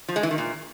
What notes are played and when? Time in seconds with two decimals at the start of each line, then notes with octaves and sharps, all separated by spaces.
0.08 F3
0.16 G#3
0.23 E3
0.31 D#3
0.38 A#2